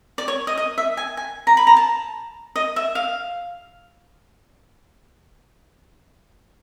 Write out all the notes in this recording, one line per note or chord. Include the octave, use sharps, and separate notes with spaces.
D5
C#5
D#5
D#5
E5
G#5
G#5
A#5
B5
A#5
A5
D#5
E5
F5